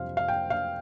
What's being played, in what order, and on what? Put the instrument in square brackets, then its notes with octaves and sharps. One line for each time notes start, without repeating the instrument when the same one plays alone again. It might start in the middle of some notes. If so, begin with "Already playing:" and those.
Already playing: [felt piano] F2 C3 G3 C5 F5
F5
G5
F5